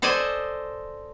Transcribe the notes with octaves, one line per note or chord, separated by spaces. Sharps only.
A4 C5 D5 D#5 G#5